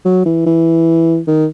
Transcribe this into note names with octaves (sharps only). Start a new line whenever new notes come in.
F#3
E3
E3
D#3